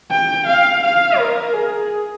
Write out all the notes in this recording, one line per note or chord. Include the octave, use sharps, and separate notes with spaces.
G5
F5
F5
A#4
G#4